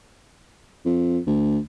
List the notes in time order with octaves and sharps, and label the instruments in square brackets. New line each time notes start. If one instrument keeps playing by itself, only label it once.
[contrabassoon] F2
D2